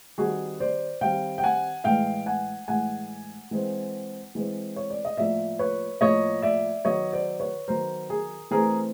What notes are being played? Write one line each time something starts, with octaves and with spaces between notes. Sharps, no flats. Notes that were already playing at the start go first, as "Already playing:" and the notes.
D#3 G3 C4 F#4 G#4
C5 D5
D#3 G3 C4 F5 G5
G5
F#5 G#5
A2 E3 G#3 F5 G5
F#5 G#5
A2 E3 G#3 F#5 G#5
E3 G#3 C4
E3 G#3 C4
C#5
D5
D#5
A2 F3 A#3 D5 E5
B4 C#5
A2 F3 A#3 C#5 D#5
D5 E5
D#3 F#3 B3 C#5 D#5
C5 D5
B4 C#5
D#3 F#3 B3 A#4 C5
G#4 A#4
E3 A3 C4 G#4 A#4